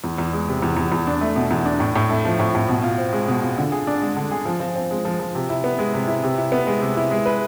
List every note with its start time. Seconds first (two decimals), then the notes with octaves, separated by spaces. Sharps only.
0.04 E2
0.18 E2
0.33 G#3
0.48 C3
0.62 E2
0.77 E2
0.92 E2
1.07 D4
1.21 A3
1.36 B2
1.51 E2
1.66 D4
1.80 A2
1.95 A2
2.10 A3
2.25 F3
2.39 A2
2.55 A2
2.68 B2
2.84 F4
2.98 C4
3.13 G#3
3.28 B2
3.42 F4
3.58 D3
3.72 G#4
3.87 D4
4.02 G#3
4.17 D3
4.31 G#4
4.45 F3
4.60 F3
4.76 C4
4.91 G#3
5.05 F3
5.20 F3
5.35 C3
5.50 E4
5.64 B3
5.79 G#3
5.94 C3
6.08 E4
6.24 C3
6.38 E4
6.52 B3
6.67 G#3
6.82 C3
6.97 E4
7.11 G#3
7.26 B4